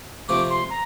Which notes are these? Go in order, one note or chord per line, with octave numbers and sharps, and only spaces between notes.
C3 F3 A3 D6
C6
A#5